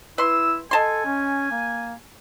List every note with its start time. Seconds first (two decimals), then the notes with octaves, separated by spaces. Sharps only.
0.18 E4 B4 C6 E6
0.71 A4 D#5 G#5 A5 C6
1.05 C#4
1.51 A#3